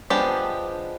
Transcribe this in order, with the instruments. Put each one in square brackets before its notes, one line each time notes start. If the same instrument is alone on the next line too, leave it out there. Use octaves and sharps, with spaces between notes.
[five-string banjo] F3 G#3 B3 D4 G4